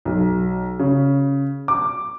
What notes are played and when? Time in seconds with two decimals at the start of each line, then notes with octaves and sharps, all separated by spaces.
0.05 B1
0.79 C#3
1.68 D6